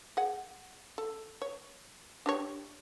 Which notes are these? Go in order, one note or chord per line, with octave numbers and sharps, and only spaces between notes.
G#4 F#5
A4
C#5
D4 G4 C#5